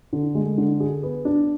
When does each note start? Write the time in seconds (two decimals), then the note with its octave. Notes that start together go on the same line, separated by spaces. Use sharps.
0.13 D3
0.35 G#3
0.58 D3
0.80 G#4
1.03 B3
1.25 D4